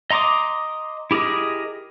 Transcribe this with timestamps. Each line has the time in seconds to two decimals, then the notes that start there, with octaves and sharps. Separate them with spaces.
0.11 D#5 A#5 C6 D6 D#6
1.11 E4 G4 G#4 A#4 D#5